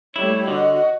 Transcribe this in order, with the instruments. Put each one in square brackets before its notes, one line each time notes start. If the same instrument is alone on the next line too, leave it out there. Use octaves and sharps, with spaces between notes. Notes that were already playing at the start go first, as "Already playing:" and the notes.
[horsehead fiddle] G3 A3 [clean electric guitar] E4 [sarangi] C#5
[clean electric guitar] D3 [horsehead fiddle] F#4 [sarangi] D#5